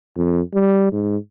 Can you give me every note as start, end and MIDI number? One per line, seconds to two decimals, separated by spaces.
0.16 0.41 41
0.54 0.89 55
0.92 1.17 44